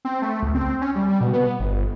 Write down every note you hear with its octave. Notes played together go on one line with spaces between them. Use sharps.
C4
A3
C#2
C4
C#4
G3
G3
B2
B3
G1